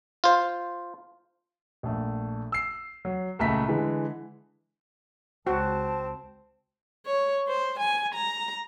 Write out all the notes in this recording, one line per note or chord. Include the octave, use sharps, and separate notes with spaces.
F4 C5
A#1 A3
E6 C7
F#3
C#2 A#2 A3 A#5 B6
D3 E3 G#3
C#2 C4 F#4 A5
C#5
C5
G#5
A#5